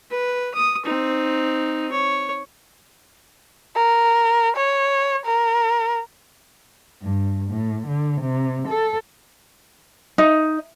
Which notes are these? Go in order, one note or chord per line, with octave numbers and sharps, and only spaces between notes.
B4
D#6
C4 D#4
C#5
A#4
C#5
A#4
G2
A2
D3
C3
A4
D#4